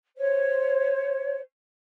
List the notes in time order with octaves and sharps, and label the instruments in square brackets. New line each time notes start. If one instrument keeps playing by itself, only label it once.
[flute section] C5 C#5